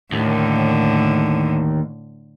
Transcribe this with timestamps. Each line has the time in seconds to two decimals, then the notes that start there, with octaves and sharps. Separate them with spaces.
0.13 D#2 A2 D3